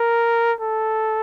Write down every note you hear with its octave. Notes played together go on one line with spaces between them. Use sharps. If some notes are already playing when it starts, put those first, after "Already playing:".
Already playing: A#4
A4